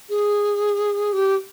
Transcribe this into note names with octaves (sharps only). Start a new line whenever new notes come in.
G#4
G4